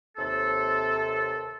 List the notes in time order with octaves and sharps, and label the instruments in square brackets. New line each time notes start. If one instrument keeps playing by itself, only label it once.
[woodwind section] D#2 C3 A4